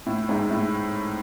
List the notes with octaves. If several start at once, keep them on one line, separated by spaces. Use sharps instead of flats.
A2
G#2
A2